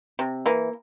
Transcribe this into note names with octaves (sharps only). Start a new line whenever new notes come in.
C3
E3 A#3